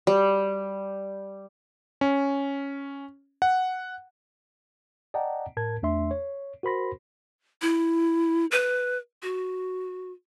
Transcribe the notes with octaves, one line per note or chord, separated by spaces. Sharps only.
G3
C#4
F#5
D5 D#5 F#5 G5 A5 A#5
A2 A#4 A5 G#6
E2 A3 D4 E5 C6
C#5
F#4 A#4 C5 B5 C6 A#6
E4
B4
F#4